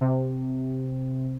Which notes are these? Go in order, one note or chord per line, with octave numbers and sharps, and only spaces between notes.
C3